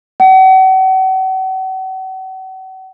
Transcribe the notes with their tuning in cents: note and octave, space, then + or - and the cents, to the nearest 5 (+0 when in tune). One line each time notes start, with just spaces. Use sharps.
F#5 +40